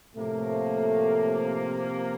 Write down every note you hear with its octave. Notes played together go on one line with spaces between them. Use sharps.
A2 C3 F3 A3 A#3